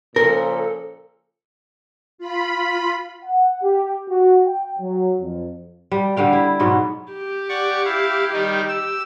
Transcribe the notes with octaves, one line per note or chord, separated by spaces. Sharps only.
A#2 C#3 F3 A4 A#4
F4 B5
F#5
G4
F#4
G5
F#3
F2
G3
D3 G3 F5 G5
E4
G#2 B2 F#3 B3
G4
D5 F#5 C#6
E4 F5
D#3 G3 D#4
E6